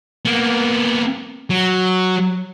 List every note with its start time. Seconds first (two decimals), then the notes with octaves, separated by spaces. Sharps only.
0.25 A#3 B3
1.50 F#3